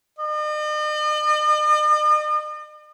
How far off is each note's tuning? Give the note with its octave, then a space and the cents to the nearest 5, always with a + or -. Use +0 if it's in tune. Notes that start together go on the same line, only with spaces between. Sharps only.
D#5 -45